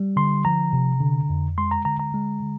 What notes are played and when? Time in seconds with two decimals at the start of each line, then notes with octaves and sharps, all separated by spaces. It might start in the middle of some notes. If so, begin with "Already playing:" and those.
Already playing: G3
0.16 D3 C6
0.45 F3 A#5
0.73 C3
1.00 D3
1.29 F2
1.58 G#3 C6
1.71 A#5
1.85 D3 A#5
1.99 A#5
2.14 G#3
2.42 D3